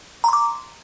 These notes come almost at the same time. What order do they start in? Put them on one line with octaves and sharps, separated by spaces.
A#5 C6 D6